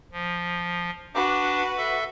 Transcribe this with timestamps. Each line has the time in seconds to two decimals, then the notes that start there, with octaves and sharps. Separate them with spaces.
0.12 F3
1.14 D4 F#4 B4 D6
1.77 A4 E5